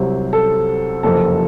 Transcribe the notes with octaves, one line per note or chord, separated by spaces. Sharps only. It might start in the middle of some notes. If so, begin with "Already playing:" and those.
Already playing: C2 C3 F#3 C5
A4
F#1 F2 C3 F3 A4